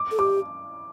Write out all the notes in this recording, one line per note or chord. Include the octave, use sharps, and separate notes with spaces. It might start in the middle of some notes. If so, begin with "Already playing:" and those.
Already playing: D6
A4
G4 D6